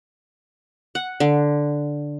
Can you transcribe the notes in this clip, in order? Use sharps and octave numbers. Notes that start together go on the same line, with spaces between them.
F#5
D3